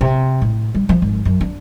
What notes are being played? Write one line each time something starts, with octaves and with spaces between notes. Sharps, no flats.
C3
A2
G3
F3
G#1
F#2
D4